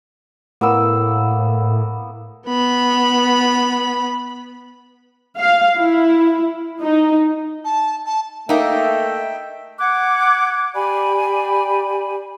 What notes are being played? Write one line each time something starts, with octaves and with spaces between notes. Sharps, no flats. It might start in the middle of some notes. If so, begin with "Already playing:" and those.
A2 A#3 B3 E6
B3 B5
F5
E4
D#4
A5
A5
A3 A#3 D#4 E5 G5
F#5 D6 F#6 G#6
G4 D5 G#5 B5